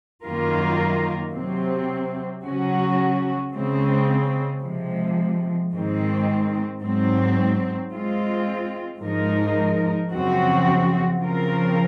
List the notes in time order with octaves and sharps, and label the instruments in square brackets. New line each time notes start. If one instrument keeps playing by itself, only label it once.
[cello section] F#2 D#3 A#3 F4 A#4
C3 F#3 C4
C#3 F#3 C#4 F#4
C#3 G#3 C4
C3 F3 G#3
G#2 D#3 G#3 C4
G#2 F#3 C4
G#3 C4 F4
G#2 F3 G#3 D#4 A#4
F#2 C#3 F3 C4 F#4
C#3 F3 C4 F4 A#4